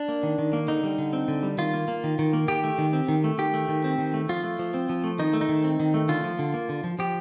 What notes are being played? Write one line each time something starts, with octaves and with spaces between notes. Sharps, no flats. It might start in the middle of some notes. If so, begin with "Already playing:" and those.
Already playing: D4
A#3
D#3
D#3
A#3
D3 D#4
G3
D3
C4
D3
G3
D#3 F4
A#3
A#3
D#3
D#3
A#3
D#3 G4
A3
D#3
C4
D#3
A3
D#3 G4
A3
D#3
C4
D#3
A3
F3 F4
A3
F3
C4
F3
A3
D#3 D#4
A3
D#4
D#3
C4
D#3
A3
D3 F4
F3
D3
A#3
D3
F3
F3 G4